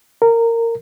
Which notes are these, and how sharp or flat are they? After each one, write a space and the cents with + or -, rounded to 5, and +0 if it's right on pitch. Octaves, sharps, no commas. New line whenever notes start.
A#4 -15